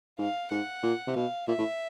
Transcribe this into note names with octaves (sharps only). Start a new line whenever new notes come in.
G#2 F5
G#2 F#5
A#2
C3
B2 F5
A#2 E5
A2